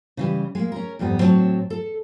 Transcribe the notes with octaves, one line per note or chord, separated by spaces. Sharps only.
C#3 E3 G3
G#3 A#3
C#4 A#4
F2 G#2 G3 B3
A2 F#3 C4 C5 C#5 A5
A4